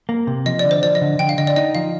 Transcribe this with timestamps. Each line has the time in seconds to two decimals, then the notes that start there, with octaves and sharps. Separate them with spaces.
0.09 A#3
0.27 C3
0.46 F3 D#5
0.59 D3 D5
0.71 C5
0.83 F3 D5
0.95 D#5
1.02 D3
1.19 D3 G5
1.29 F5
1.38 D3 D#5
1.47 D5
1.56 D#4 D#5
1.75 F3 F5